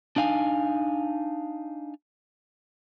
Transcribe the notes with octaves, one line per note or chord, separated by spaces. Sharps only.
D4 D#4 F5 G#5